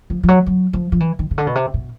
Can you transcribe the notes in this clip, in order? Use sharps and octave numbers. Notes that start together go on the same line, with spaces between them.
F3
F3
F#3
F#3
F3
F3
E3
D#3
C#3
D3
B2
C3
B2